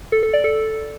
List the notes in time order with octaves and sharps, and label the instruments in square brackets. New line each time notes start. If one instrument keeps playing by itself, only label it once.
[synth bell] A4
A4
D5
A4